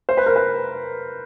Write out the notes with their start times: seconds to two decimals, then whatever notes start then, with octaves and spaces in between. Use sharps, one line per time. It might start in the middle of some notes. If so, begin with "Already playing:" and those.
0.09 C5
0.17 B4
0.26 A#4
0.36 B4